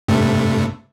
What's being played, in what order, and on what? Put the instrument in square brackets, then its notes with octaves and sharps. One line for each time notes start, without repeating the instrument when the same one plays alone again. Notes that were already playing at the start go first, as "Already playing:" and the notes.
[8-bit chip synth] G2 C3 A3